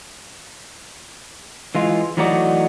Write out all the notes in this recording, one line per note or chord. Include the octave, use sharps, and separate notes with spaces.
E3 G#3 F4
E3 F#3 A3 D#4 F#4 D5